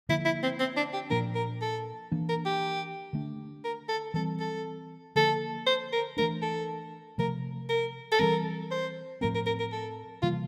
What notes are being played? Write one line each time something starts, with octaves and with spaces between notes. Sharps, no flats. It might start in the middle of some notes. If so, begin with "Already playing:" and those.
D3 F3 A#3 E4
E4
C4
C4
D4
G4
A#2 F3 A#3 D4 A#4
A#4
A4
E3 A#3 D4
A#4
G4
D3 A3 D4
A#4
A4
E3 G3 C4 A4
A4
D3 F3 A#3 A4
C5
A#4
E3 A3 D4 A#4
A4
C3 F3 A3 A#4
A#4
A4
E3 G3 C4 A#4
C5
A2 F3 A3 C4 A#4
A#4
A#4
A#4
A4
C3 E3 G3 A#3 F4